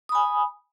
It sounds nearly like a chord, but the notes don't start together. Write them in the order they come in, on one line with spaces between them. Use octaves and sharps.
D#6 B5 G#5